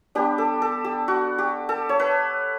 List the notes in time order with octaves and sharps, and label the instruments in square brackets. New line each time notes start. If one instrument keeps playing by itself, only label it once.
[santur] G3 B3 D4 G4
A4
A4
G4
F#4
G4
A4
C#5
B4